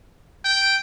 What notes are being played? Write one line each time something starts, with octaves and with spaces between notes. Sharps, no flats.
G5